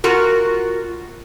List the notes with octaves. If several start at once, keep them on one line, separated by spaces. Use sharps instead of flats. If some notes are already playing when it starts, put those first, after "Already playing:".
F4 F#4 A#4